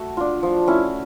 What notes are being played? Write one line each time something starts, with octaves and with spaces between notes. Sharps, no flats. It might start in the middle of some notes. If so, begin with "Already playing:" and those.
Already playing: A3 F#4
D4 F4
F3
A3 C#4 E4